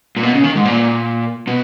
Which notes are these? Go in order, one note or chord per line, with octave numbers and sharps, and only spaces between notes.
A#2
B2
C#3
D#3
G#2
A#2
B2